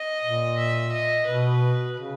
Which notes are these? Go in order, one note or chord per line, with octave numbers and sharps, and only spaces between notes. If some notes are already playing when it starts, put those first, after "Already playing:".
Already playing: D#5
A#2
E5
D#5
B2 B4
C#3